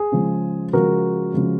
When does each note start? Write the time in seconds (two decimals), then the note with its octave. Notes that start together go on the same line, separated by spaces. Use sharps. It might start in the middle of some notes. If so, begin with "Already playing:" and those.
Already playing: G#4
0.12 C#3 F3 G#3
0.73 C#3 F3 G#3 F#4 A#4
1.34 C#3 F3 G#3